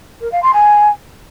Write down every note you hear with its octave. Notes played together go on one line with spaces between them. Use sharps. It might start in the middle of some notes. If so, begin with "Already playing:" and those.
A#4
F5
C6
G#5